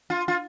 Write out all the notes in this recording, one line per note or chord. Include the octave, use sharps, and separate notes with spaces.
F4
F4